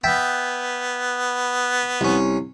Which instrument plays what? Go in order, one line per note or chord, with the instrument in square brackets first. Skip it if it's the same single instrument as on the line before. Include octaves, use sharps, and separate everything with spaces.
[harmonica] B3 [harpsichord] E5 G5 A5
[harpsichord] C2 C#4